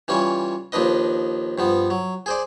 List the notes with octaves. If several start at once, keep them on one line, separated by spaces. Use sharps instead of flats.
E3 G3 C#4 F4 C#5
D#2 F3 D4 B4 D#5
G2 F3 B3
F#3
G#4 C5 D5